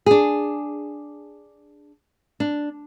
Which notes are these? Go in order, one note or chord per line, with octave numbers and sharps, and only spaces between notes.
D4 G#4
D4